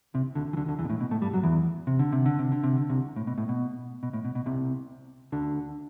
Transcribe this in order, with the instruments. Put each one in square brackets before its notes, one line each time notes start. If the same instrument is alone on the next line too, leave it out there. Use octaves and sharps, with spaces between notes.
[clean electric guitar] C2 C3
D2 D3
E3
D2 D3
D2 D3
E2 E3
B2
A2
B2
A2 A3
G2 G3
F#2 F#3
E2 E3
C3
D3
C3
D3
C3
D3
C3
D3
C2 C3
A2
B2
A2
B2
B2
A2
B2
B2
C2 C3
D2 D3